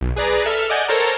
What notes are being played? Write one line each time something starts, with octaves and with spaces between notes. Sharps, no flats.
B1
G#4 B4 D5 A#5
A4 E5 F6
D5 D#5 F#5 G#5 G6
A4 A#4 C5 C#5 A5 A#5